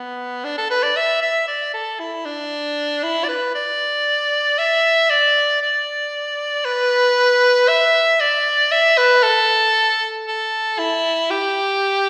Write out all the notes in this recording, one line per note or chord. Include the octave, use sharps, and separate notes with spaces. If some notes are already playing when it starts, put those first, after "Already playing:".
Already playing: B3
D4
A4
B4
D5
E5
E5
D5
A4
E4
D4
E4
D5
B4
D5
E5
D5
D5
B4
E5
D5
E5
B4
A4
A4
E4
G4